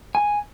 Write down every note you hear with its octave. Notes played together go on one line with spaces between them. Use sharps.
G#5